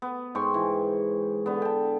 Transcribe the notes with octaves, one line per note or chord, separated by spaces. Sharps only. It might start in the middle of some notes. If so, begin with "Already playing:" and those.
B3
G#2 G5 C6 C#6
E3
D3 B3
G5 A5